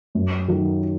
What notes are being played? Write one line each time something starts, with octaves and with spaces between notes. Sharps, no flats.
F#2
D#3 F#3